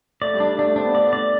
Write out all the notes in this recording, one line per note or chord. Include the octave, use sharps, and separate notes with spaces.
A3 D5
G3
D4
A3 D4
C4 D4
B3
A3 D5
B3
D5